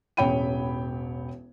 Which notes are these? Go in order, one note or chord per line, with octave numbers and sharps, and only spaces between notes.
E1 A1 C#5 G5 B5 D#7